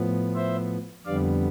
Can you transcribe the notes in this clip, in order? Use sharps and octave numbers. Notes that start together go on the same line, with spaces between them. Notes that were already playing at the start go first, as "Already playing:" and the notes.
Already playing: A2 F3 B3
C5 E5
F2 D3 G3 B3 D5 F5